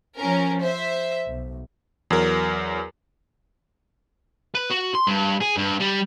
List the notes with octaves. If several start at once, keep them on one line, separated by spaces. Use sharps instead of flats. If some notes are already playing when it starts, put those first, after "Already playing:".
F3 C#4 A#4
C5 E5
B1
E2 F#3 A#4
B4
F#4
C6
G2
G#4
G2
G3